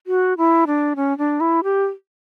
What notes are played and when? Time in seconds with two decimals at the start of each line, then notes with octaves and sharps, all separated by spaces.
0.07 F#4
0.38 E4
0.67 D4
0.96 C#4
1.18 D4
1.40 E4
1.64 G4